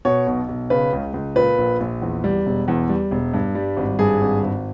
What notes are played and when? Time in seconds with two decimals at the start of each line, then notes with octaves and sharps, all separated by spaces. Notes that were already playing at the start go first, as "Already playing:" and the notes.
0.05 B2 C#5
0.27 B1
0.49 B1
0.70 C#3 B4
0.93 C#2
1.14 C#2
1.36 A#2 B4
1.58 A#1
1.80 A#1
2.02 E2
2.24 G3
2.46 E1
2.68 E2
2.89 G3
3.11 E1
3.34 G2
3.55 G3
3.77 G#1
3.99 G2 G#4
4.21 G#1
4.43 G#1